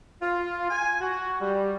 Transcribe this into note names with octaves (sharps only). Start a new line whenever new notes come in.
F4
G#5
F#4
G3